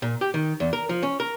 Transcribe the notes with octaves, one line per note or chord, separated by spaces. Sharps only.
A#2
G4
D#3
E2
A#4
F3
C#4
A#4